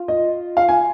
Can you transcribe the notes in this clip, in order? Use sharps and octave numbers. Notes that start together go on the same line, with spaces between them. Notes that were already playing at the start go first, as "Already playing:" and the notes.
Already playing: F4
D#5
F5
G#5